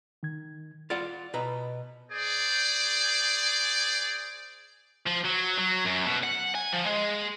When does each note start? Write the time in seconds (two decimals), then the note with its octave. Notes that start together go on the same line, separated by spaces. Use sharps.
0.23 D#3 G#6
0.90 F4 D5 F#5 A6
1.34 B2 B4 A#5
2.11 G#4 C5 D5
5.06 F3
5.24 F#3
5.58 F#3
5.85 F#2
6.05 B2
6.24 F#5
6.55 G#5
6.73 F3
6.86 G#3